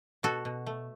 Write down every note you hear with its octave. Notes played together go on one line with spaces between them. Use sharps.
B2 F#4 A4
B2
A3